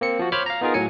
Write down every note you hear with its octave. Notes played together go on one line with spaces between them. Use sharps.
A#3 C4 C#7
F3 F#4
C5 C#5 B5 D6 F6
F5 A#5
B3 D#4 F4 G#4 A#4
A2 F#3 G#5 C#7